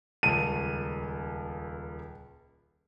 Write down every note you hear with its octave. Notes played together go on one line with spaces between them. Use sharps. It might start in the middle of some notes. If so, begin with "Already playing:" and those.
D#1 C#2 A5 D#7